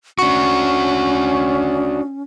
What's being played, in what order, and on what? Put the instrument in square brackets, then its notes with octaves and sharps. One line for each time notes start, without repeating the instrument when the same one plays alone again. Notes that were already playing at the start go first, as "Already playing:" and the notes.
[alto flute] C#4 [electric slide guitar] D4 F#4 [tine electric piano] C#6